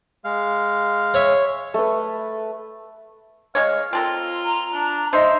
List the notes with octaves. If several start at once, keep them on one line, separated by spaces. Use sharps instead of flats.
G#3 F5
C#5 E5
A3 B4
G#3 C#5 F5
C4 F4 A4 A#4
A#5
D4
D#4 C5 D#5 E5